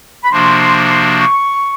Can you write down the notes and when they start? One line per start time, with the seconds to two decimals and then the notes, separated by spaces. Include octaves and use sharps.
0.23 B5
0.32 C3 F3 A#3 D4 F#4 C6
0.90 C6
1.19 C#6